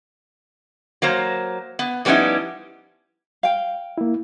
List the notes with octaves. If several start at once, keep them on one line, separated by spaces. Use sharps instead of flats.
F#3 A#3 C5 A#5
B3
F3 G3 B3 C#4 D#4 E4
F5 G5
A#3 E4